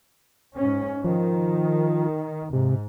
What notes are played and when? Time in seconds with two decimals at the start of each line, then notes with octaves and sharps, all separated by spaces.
0.56 G#2 C#4
1.04 D#3 F3
2.53 G#2 C3